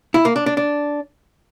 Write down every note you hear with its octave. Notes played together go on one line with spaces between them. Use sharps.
E4
A#3
D4
D4
D4